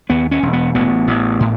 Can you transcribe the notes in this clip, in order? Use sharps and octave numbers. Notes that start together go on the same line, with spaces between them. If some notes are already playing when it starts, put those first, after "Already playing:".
D#2 B3
C#4
E1
B3
A1 B3
A1
A2